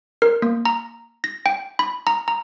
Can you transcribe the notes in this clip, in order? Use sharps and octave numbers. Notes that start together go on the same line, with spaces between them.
A#4
A#3
A#5
A#6
G5
B5
A#5
A#5